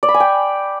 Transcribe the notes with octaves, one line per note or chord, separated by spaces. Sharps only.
D5
B5
G#5
G5